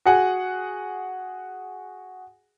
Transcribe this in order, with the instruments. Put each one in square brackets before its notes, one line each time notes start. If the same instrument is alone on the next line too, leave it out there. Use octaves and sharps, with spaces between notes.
[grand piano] F#4 G#4 F#5 G#5